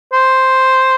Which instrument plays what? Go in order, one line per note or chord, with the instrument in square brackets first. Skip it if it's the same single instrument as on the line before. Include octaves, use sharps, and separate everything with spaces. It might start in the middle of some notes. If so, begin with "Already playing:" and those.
[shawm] C5